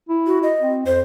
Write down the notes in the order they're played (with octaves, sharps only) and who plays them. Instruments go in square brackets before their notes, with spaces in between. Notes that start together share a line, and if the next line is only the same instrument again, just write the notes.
[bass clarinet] E4
[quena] F#4
D#5
[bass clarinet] C4
[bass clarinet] F2 [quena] C5